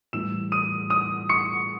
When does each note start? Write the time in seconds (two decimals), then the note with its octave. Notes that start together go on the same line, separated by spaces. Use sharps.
0.13 A2 E3 G3 E6 E7
0.52 D#6 D#7
0.90 D#6 D#7
1.29 C#6 C#7